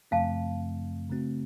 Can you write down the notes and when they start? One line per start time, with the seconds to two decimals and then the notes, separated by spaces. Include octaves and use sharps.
0.11 F#2 C#3 F3 A3 C4 F5 A5
1.09 C#3 A3 C4 F#4